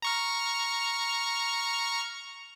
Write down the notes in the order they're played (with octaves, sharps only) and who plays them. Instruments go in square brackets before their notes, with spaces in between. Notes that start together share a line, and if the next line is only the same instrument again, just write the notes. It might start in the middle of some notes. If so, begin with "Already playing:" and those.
[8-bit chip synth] A#5 C#6 F6